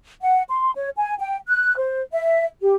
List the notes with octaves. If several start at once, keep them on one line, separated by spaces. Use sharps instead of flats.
F#5
C6
C#5
G#5
G5
F#6
C5
E5
G4